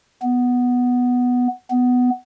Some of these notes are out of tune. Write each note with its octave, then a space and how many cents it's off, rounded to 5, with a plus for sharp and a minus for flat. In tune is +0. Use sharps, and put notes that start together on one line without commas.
B3 +0
B3 +10